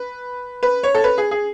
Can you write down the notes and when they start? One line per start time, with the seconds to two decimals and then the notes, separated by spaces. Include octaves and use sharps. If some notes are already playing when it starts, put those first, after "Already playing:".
Already playing: B4
0.63 B4
0.83 C#5
0.95 A4
1.04 B4
1.18 G#4
1.31 G#4